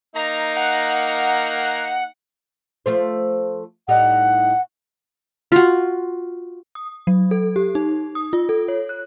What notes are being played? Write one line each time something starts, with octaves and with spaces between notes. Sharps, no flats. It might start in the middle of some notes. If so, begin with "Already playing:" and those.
A#3 D#4 A#5
F#5
F3 A3 C5
A2 G3 D#4 F#5
F4 F#4
D#6
F#3
A4
G4
D#4
D#6
F4
A4
C#5
F#6